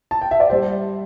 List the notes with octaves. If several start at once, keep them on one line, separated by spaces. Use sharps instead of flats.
A5
G5
E5
D5
G3 C5